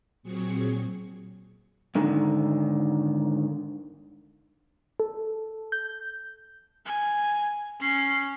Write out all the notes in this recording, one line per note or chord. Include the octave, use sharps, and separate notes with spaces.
A#2 F#3 C4 G#4 C#6
G#2 D3 D#3
A4
G6
G#5
C#4 C7